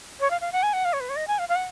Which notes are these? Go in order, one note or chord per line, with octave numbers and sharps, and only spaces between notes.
C#5
F5
F5
F#5
G#5
F#5
F5
C#5
B4
C#5
D#5
G#5
F5
F5
F#5